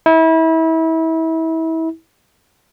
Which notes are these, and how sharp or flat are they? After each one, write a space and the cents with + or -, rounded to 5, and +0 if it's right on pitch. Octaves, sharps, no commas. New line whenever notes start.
E4 -30